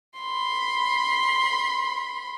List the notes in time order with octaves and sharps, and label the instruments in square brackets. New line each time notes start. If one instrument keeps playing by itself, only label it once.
[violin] B5 C6